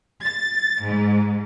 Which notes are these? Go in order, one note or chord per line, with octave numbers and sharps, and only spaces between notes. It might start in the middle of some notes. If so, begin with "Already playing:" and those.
A6
G#2